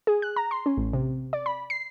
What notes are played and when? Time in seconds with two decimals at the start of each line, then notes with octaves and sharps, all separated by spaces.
0.07 G#4
0.22 F#6
0.36 A#5
0.51 C6
0.66 C#4
0.77 A1
0.93 C3
1.33 D5
1.46 B5
1.70 C7